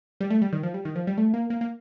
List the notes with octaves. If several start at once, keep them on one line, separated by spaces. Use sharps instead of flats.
G3
A3
G3
D#3
F3
G3
D#3
F3
G3
A3
A#3
A#3
A#3